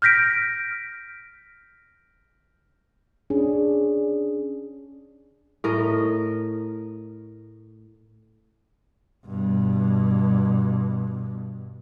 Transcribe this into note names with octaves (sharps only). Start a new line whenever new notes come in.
F6 G6 A#6 B6 D7
C#4 D4 G#4
A2 A#4 D#5
G2 B2